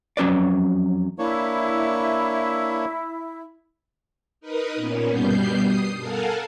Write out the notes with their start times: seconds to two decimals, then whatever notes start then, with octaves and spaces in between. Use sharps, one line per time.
0.17 F2 F#3 C#4 B4 D5
1.19 A#3 D4 E4 C#5
4.41 D#4 A#4 B4 D#6
4.75 A#2 A#3 B3 C#4
5.09 G2 B2 G3 B3 G6 C7
5.60 D#6 C7
6.00 A4 A#4 F5 F#5 G#5 A5